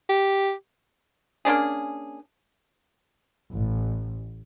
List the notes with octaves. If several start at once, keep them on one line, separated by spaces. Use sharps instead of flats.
G4
A#3 C#4 D4 G#4
A1